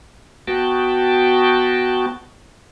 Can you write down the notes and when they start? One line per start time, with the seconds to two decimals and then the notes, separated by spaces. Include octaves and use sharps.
0.47 B3 F#4 G5 A5